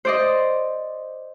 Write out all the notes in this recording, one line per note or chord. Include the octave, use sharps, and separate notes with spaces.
C5 D5 D#5